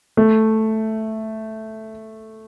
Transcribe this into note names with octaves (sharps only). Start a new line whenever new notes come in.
A3